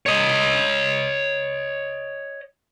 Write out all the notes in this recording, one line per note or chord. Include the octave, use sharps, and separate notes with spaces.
C#5 D#5